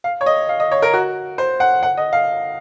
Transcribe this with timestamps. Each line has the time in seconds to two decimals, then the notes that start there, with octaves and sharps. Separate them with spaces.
0.04 F5
0.21 C#5
0.26 D#5
0.49 F5
0.60 D#5
0.71 C#5
0.82 A#4
0.93 F#4
1.38 C5
1.60 F#5
1.83 F#5
1.97 D#5
2.13 F5